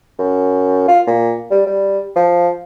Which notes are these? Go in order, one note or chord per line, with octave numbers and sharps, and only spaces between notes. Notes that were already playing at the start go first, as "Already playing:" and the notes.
F#2
F4
A#2
G3
G3
F3